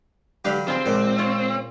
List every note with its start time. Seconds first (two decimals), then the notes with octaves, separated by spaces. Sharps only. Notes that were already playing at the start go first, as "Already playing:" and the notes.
0.45 G2 D3 F#3 G4 B4 F5
0.68 C4 F4 G#4 C6
0.86 C#2 A#2 C5 D6
1.18 F4 C#5